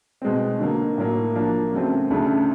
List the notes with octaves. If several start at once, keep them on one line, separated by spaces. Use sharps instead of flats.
B2 G#3 C4
D3 F#3 A#3
A2 F#3 A#3
F3 A#3 D4
C#3 F#3 A3 C4
D2 C#3 F#3 A3